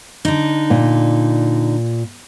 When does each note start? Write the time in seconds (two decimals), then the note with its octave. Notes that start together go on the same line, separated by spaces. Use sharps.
0.25 D3 D#4
0.70 A#2